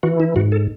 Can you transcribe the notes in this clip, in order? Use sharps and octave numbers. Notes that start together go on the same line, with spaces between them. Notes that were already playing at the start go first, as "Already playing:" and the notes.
E3 F#4
E4
G#2 F#4
A4